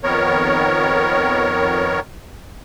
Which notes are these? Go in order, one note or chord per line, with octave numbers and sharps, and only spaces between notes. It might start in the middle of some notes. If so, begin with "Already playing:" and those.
F2 D#3 B3 A#4 C#5